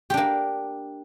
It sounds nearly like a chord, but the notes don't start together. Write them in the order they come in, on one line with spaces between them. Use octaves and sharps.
G4 D4 A#3